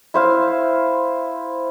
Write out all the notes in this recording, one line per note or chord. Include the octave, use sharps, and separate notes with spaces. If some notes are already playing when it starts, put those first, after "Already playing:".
E4 C5 F5